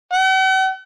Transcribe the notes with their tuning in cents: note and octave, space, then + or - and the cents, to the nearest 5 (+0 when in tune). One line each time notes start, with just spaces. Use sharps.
F#5 +45